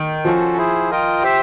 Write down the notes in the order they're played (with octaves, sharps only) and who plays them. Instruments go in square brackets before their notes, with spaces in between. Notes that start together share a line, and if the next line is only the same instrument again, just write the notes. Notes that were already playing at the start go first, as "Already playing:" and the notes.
Already playing: [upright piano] D#3
[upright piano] F3 [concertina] C#4 F#4 A4 C5
[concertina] E4 G#4 C5
F4 A#4 D#5 G5
G4 C5 E5